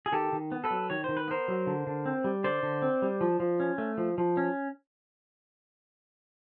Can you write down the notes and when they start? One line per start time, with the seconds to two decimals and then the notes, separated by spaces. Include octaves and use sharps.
0.06 G#4
0.12 D#3 G4 A4
0.33 D#3
0.52 B3
0.64 A4 B4
0.71 F#3
0.90 D#3 C#5
1.04 D#3 C5
1.17 B4
1.28 B3 A#4 C5
1.48 F#3
1.67 D3
1.87 D3
2.06 C4
2.24 G3
2.44 D3 C5 D5
2.63 D3
2.82 C4
3.02 G3
3.21 F3
3.40 F3
3.60 C#4
3.78 A3
3.98 F3
4.18 F3
4.37 C#4